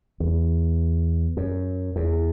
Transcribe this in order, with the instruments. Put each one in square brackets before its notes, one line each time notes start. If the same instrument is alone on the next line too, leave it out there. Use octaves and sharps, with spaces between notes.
[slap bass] E2
F#2
E2